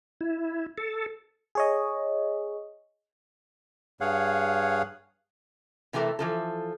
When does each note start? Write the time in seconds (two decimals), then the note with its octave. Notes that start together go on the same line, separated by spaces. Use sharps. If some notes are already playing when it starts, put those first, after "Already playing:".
0.21 E4
0.78 A4
1.55 G#4 C#5 D#5
4.01 G2 G#4 C#5 F5 F#5
5.93 C3 E3 A3 G4 A4 A#4
6.19 E3 F3 A4